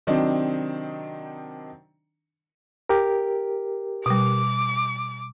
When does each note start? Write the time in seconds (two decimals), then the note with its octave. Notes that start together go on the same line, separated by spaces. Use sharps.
0.07 C3 D#3 F#3 C4 D4 D#4
2.89 G4 A#4
4.06 B2 G3 D6